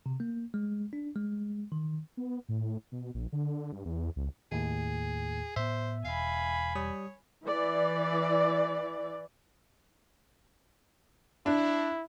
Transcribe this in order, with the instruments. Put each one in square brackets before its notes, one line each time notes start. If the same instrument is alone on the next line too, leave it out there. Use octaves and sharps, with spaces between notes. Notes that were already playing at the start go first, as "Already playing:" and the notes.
[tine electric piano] C3
A#3
G#3
D4
G#3
D#3
[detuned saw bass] B3
A2
B2
A#1
D3
G2
E2
C#2
[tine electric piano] D#2 A2 [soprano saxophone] G#4
[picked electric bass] A2 B3 [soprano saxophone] C5 [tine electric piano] E5
[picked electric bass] E1 [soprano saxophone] F5 [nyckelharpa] G#5 B5
[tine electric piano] G3 D#6 [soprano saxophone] C#5
[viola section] E3 D5
[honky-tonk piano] D4 [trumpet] E4